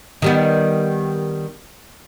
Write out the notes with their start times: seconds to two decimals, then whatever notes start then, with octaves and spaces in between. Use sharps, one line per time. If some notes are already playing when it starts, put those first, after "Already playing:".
0.22 D#3 G3 B3